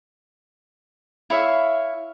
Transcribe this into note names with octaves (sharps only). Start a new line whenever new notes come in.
E4 C#5 E5 F5